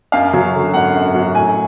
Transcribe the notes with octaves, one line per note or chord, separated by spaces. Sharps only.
F#2 F5
F#3
D3
G#1 F#5
F#2
F#3
A2 G#5